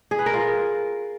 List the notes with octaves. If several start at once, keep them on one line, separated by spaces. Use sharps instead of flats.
G#4
B4
A#4
F4